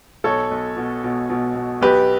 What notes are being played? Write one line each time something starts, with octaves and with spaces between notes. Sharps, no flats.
B1 A4 C#5
B1
B2
B2
B2
B2
B1 G4 B4